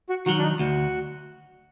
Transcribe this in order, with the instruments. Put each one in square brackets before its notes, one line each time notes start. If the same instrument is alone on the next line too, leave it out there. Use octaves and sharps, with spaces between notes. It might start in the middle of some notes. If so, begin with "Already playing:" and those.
[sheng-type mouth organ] F#4
[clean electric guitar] D#3 F#3 [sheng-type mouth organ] F#4
[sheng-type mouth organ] D4
D#4
[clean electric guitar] D2 [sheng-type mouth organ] F#4